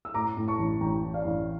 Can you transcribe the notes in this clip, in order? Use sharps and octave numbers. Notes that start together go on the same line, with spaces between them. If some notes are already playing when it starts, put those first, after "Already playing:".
E6
A2 A#5 D6
A2
A5 C#6
A1
A1 G5 A#5
A2
D5 F5
A1